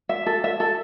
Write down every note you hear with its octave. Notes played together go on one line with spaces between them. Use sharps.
E5
A4
E5
A4